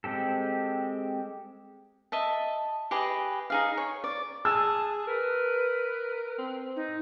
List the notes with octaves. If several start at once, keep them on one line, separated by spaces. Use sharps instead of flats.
G#3 C4 G4 A4
D#5 E5 A5
G4 G#4 B4 D#5
D#4 G#4 F5
C#5
D5
G#4 A5 E6
A#4 B4
C4
D#4